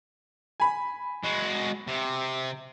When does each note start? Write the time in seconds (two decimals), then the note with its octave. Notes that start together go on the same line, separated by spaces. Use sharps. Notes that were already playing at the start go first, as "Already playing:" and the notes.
0.60 G#5 B5
1.24 G#3 F#4
1.87 C3